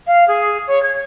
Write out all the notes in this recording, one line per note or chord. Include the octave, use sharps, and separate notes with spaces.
F5
G#4
C#5
G#6